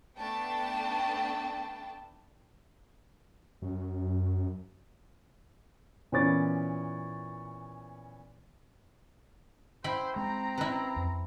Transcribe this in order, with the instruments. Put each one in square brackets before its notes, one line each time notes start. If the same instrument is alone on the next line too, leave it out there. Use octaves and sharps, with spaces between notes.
[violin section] A3 B3 D4 G5 A5
[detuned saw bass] F#2
[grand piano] A#2 E3 B3 C#4 D6 A6
[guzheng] E4 G5 B5 [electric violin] C5
[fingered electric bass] G#3 [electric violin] C4 A#5
[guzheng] E4 B4
[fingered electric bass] F2